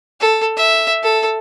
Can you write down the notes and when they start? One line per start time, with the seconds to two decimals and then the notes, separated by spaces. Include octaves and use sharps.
0.20 A4
0.57 E5
1.03 A4